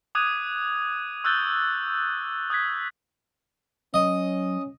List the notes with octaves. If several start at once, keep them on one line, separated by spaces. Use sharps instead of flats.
D6 D#6 F#6 G#6 D#7 F7
C#6 E6 F#6 G6 A6 G7
D#6 F#6 G#6 B6
F#3 C#4 D#5